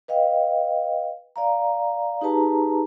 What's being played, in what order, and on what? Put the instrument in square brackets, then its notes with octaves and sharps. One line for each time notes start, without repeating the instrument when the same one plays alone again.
[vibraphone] B4 D#5 F5 G5
D5 F5 A#5
D#4 G4 G#4 B4 A5 A#5